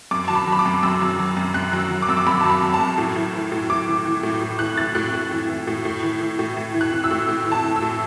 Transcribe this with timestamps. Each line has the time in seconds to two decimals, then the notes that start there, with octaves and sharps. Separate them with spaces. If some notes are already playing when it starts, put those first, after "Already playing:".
0.11 F#2 D6
0.28 F#3 A5
0.35 B5
0.47 F#3
0.52 B5
0.59 D6
0.66 F#2
0.83 F#2 E6
1.01 F#3
1.19 F#3
1.37 F#2
1.54 F#2 F#6
1.73 F#3
1.79 E6
1.91 F#3
2.02 D6
2.09 F#2 E6
2.17 D6
2.27 F#2 B5
2.41 F#3 A5
2.50 B5
2.62 F#3
2.74 A5
2.80 F#2
2.98 A2
3.16 E3
3.34 E3
3.52 A2
3.70 A2 D6
3.88 E3
4.05 E3
4.23 A2
4.41 A2
4.59 E3 F#6
4.77 E3 A6
4.95 A2 F#6
5.14 A2
5.31 E3
5.49 E3
5.67 A2
5.85 A2
6.03 E3
6.21 E3
6.39 A2
6.57 A2
6.74 E3
6.81 F#6
6.92 E3
7.04 E6
7.11 A2
7.29 A2
7.46 E3
7.52 A5
7.64 E3
7.76 E6
7.82 A2